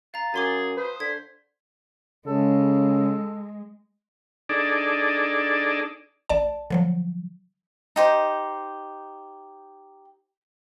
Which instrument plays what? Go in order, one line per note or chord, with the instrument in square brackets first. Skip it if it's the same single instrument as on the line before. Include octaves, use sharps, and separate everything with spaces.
[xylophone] F5 A#5 [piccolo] A6
[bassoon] F#2 [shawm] G#4 [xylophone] G#5 C6 D6
[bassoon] B4 [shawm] C5 [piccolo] D#6
[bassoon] D3 [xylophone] G#6 [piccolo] B6
[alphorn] C#3 [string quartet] G#3 [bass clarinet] A4
[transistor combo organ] D4 D#4 G#4 A4 D5
[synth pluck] A1 D5 A5
D3 F3 F#3
[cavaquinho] D#4 G4 C5